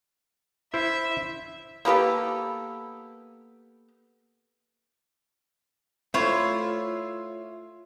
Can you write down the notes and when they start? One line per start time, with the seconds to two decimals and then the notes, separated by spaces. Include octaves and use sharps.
0.74 E4 C5 E5
1.85 A#3 B3 G4 A4
6.14 A3 E4 F4 C5 C#5 E5 C6